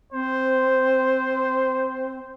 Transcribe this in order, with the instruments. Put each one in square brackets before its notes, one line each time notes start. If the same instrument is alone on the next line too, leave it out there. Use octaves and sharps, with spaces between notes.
[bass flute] C4 [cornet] C5